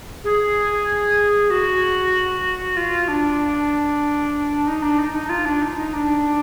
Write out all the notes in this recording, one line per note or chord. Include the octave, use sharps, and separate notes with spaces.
G#4
F#4
F4
D4
D#4
D4
D#4
D#4
F4
D4
D#4
D#4
D4